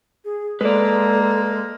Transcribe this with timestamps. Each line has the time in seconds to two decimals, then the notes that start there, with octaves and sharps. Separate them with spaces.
0.25 G#4
0.61 G#3 A#3 A4 B4 D5